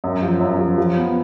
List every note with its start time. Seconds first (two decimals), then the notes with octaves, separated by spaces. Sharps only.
0.04 F#2
0.22 F3
0.40 F#2
0.59 F3
0.78 F3
0.96 B3